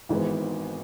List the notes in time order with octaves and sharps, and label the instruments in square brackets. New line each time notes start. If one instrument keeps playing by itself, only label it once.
[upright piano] G#1 G#2 E3 B3